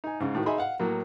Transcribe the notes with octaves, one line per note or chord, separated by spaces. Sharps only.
D#4 G#5
G#2 C#3
A2 D#3 F#4
D#4 G#4 D#5 E5 B5 C6
F5 F#5
A2 F#3 A#3